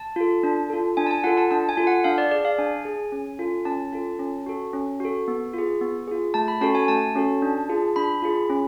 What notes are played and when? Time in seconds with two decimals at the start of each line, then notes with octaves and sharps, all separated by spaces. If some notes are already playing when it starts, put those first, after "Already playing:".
Already playing: A5
0.16 F4 A4
0.43 D4
0.70 F4 A4
0.97 D4 G#5
1.07 A5
1.11 G#5
1.24 F4 A4 F#5
1.37 A5
1.51 D4 A5
1.69 G#5
1.77 F4 A4
1.87 F#5
2.04 D4 F5
2.18 D5
2.31 G#4 D5
2.45 F5
2.58 D4 G#5
2.85 G#4
3.12 C#4
3.39 F4 A4
3.65 C#4 A5
3.93 F4 A4
4.19 C#4
4.46 F#4 A4
4.73 C#4
5.00 F#4 A4
5.28 B3
5.53 F4 G#4
5.81 B3
6.08 F4 G#4
6.34 A3 A5
6.48 B5
6.61 C#4 F#4 A4 A5
6.75 G#5
6.88 A3 A5
7.15 C#4 F#4 A4
7.42 D4
7.69 F4 G#4
7.96 D4 B5
8.22 F4 G#4
8.49 C#4